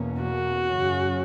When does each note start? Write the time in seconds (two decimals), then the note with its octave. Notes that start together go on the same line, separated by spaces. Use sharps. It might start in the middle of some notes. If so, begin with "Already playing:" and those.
Already playing: E2 B2 A#3 C#4
0.21 F#4
0.66 F#2 C#3 F#3 C#4